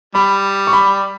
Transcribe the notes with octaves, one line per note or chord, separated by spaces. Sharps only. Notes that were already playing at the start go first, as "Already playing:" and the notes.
G3 B5
C#6
B5